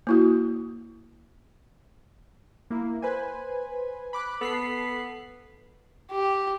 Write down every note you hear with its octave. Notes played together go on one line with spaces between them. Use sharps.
A#3 E4 F#4
A#3 E4
B4 C5 G#5
B5 D6 F#6
B3 A4 B6 C7
G4